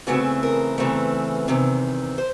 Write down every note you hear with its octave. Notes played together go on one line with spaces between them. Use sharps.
E2 C#3 E3 A3 C4 F#4
A#4
E2 C#3 E3 A3 C4
E2 C3 D#3
C5